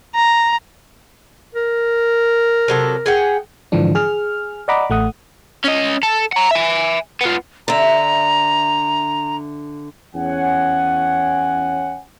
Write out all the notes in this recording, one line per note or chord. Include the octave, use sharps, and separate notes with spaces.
A#5
A#4
C3 F#3 A4
G#4 F#5 G5
G#2 D3 E3 F3 D4
G#4 F6
D5 D#5 F#5 A#5 B5 D6
A1 A3 F#5 D#6
C#4 D#5
A4
F#5 A#5
E5 G#5
B3 F4
D3 E5 A#5
E2 C#4 F#5 G#5